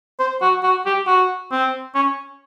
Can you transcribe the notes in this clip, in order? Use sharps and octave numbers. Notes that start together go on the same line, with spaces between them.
C5
F#4
F#4
G4
F#4
C4
C#4